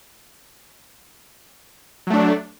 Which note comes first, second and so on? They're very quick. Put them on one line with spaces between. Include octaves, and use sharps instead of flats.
F#3 A3 D4